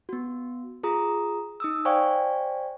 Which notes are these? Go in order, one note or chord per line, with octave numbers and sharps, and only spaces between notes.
B3 F#4
F4 G#4 A#5 D#6
D#4 D#6 E6
C5 D5 F5 G5 G#5 C#6